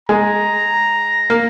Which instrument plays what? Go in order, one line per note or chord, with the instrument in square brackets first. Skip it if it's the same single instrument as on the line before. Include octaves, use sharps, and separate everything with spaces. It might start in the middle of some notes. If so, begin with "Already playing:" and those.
[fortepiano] G#3 [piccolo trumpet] A#5
[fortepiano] A#3